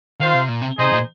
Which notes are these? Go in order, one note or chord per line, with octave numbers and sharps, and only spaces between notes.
D#3 F4 C5 F5
C3
A#2
C3
C3 D#4 G#4 C5 D#5
A#2